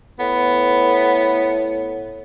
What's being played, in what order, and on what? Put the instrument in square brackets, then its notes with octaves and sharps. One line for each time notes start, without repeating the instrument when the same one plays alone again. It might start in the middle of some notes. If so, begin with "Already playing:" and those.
[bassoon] A2 [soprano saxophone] B3